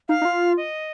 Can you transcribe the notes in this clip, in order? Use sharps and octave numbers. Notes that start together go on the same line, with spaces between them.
D#4 F5
D#4
F4
D#5